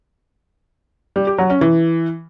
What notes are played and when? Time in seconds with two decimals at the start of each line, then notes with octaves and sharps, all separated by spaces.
1.16 G3
1.27 G4
1.38 F#3
1.50 C#4
1.61 E3